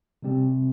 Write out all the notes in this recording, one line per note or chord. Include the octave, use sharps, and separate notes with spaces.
C3 G3 C4 G4